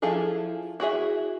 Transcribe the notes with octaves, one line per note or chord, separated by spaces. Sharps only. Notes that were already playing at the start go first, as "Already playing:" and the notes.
F3 E4 F4 G#4 A4
E4 F#4 G#4 E5